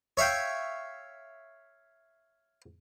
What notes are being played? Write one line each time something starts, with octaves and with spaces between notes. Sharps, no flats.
C#5 E5 F5 G5